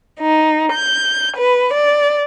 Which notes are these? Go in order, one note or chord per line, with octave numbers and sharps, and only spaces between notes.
D#4
G6
B4
D5